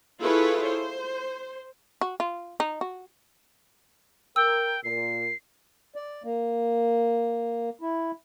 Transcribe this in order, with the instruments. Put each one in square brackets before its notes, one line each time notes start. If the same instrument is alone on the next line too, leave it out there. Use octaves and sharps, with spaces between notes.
[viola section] E4 F4 G#4 A4 B4 C#5
C5
[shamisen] F#4
F4
D#4
F#4
[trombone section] A#4 [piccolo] G5 [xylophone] E6
[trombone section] A#2 A#4 [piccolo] C7
[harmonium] D5
A#3
E4